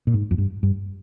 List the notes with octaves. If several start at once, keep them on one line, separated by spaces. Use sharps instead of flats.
A#2
G#2
F2
G2
G2